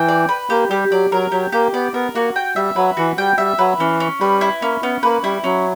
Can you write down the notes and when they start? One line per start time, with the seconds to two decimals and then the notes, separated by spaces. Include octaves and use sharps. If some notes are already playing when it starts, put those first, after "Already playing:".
Already playing: E3 G5
0.08 D5
0.29 B4
0.50 A#3 G4
0.70 G3 G4
0.92 F#3 D5
1.12 F#3 A#4
1.32 F#3 G4
1.52 A#3 G4
1.74 B3 D5
1.94 B3 A#4
2.15 A#3 F#4
2.36 G5
2.56 G3 E5
2.76 F#3 B4
2.97 E3 F#4
3.18 G3 G5
3.38 G3 E5
3.59 F#3 B4
3.79 E3 C#4
4.00 C#4
4.21 G3 B4
4.41 E4
4.62 A#3 C#4
4.83 B3 C#4
5.03 A#3 B4
5.24 G3 E4
5.44 F#3 C#4